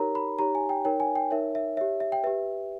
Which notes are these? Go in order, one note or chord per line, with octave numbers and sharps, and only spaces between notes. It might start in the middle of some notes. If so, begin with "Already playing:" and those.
Already playing: D#4 G4 A#4 C#5 A#5
B5
D#4 G4 C#5 A#5
G#5
G5
D#4 A#4 C#5 G5
G#5
G5
D#4 A#4 C#5 E5
E5
G4 C#5 E5
E5
G5
G4 B4 E5